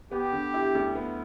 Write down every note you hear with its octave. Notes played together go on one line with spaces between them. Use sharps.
B3 G4
D3
E4
D2
B3